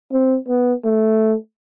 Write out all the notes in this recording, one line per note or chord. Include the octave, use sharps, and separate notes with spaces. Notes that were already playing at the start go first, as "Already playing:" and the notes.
C4
B3
A3